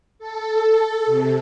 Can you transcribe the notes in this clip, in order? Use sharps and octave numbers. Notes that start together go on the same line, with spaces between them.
A4
C3